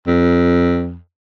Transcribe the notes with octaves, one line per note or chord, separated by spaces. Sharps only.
F2